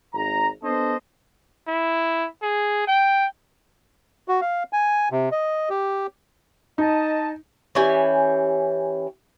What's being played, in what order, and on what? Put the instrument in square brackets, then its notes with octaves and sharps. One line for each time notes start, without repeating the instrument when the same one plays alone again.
[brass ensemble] G#1 A#5
B3 D4 A4 C5 D#5
[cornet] E4
G#4
G5
[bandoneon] F#4
F5
G#5
C3
D#5
G4
[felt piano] D#4 [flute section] D#5 A5
[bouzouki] E3 C#4 G4 G#5